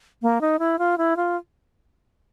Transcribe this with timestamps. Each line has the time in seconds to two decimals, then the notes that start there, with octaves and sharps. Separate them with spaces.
0.22 A#3
0.41 D#4
0.59 E4
0.79 F4
0.98 E4
1.17 F4